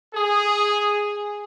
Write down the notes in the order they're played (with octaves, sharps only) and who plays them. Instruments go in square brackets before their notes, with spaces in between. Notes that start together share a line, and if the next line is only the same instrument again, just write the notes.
[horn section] G#4